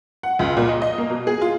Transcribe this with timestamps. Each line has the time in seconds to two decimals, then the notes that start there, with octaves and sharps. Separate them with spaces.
0.23 F#5
0.39 C#2
0.57 A#2
0.69 D#5
0.82 D#5
0.98 A#3
1.10 B2
1.27 G#4
1.42 F4